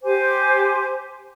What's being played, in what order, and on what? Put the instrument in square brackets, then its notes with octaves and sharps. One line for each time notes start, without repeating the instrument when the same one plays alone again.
[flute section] G4 C5 G#5 D6